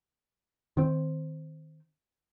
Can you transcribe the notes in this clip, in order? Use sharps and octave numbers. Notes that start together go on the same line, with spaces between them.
D#3 C4